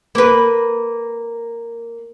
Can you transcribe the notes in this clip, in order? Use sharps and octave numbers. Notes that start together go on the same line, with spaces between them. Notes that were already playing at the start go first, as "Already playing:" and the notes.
A#3 B4